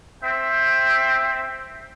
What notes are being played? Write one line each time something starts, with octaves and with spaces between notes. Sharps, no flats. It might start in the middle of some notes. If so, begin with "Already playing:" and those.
C4 E5 G5